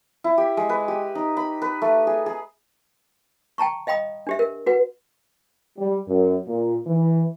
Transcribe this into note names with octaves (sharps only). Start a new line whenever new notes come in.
E4
G4
G#3
B4
G4
D#4
B5
B4
A3
G#4
G#4
G5 A5 A#5 C#6
D#5 F5 G5 B5 D#6
D4 G4 E5
A#4
F#4 B4 F#5
G3
F#2
A#2
E3